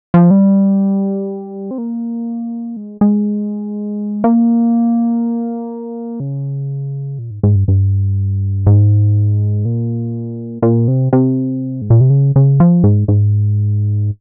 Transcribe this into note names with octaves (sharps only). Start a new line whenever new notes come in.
F3
G3
C4
A#3
G#3
G#3
A#3
C#3
A#2
G#2
G#2
G2
G2
G#2
A#2
A#2
C3
C3
G#2
A#2
C3
C#3
C#3
F3
G#2
G#2